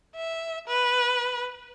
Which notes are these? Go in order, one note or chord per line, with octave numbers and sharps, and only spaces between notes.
E5
B4